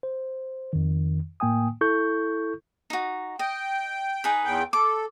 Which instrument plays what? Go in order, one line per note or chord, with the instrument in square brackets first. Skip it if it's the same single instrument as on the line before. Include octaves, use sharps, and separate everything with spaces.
[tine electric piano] C5
F2 D#3
A2 A#3 G5 G#5 D#6
E4 A4 C#6 G6
[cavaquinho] D#4 F#4
[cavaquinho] D#5 [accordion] G5
[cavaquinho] D#4 G#4 B4
[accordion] E2 G5
[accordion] A4 [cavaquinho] D6